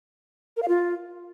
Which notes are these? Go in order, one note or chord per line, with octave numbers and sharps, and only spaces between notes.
A#4
F5
F4